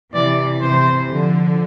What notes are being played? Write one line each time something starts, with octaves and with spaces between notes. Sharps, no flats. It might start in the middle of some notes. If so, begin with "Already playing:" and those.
C3 E3 D5
C3 E3 C5
D3 F3